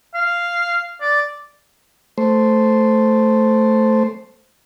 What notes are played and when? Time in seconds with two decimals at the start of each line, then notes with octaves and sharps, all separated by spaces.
0.14 F5
1.01 D5
2.18 A3 C5